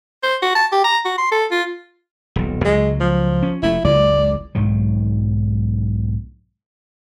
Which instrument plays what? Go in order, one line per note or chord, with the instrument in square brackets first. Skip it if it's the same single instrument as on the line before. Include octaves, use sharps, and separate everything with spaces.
[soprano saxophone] C5
F#4
A5
G4
A#5
F#4
C6
A4
F4
[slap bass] D#1 B1
[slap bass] C#2 F#3 [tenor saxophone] G#3
[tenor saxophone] F3
[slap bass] C#4
[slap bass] F1 A3 [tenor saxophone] E4
[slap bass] F#1 C#2 G#3 [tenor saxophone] D5
[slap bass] B1 G#2 D#3 F#3